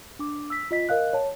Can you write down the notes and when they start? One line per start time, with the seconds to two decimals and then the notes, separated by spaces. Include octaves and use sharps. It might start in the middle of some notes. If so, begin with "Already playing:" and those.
0.19 D4 D6
0.50 E6 B6
0.71 F4 D#5 B6
0.89 A#4 D#5 F5 F#6
1.13 C#5 A5